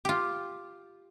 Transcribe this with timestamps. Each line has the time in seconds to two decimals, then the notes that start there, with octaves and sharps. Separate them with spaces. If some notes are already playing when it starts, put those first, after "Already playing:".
0.05 F4 G4